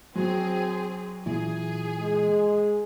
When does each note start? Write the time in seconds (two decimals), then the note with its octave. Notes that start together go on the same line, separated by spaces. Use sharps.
0.15 F#3 C4 G#4
1.26 A#2 E3 G#4
2.00 G#3